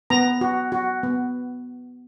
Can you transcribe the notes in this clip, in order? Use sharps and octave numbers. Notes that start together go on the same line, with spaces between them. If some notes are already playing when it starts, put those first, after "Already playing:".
B3 A#5
F#4
F#4
B3